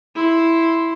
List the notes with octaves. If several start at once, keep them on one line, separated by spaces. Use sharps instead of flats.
E4 C6